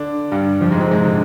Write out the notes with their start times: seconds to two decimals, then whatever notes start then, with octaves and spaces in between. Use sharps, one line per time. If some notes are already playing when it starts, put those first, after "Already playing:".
Already playing: D3 D4
0.31 G2 G3
0.61 F2 F3
0.71 G#2 G#3
0.81 C3 C4
0.91 G#2 G#3
1.05 D3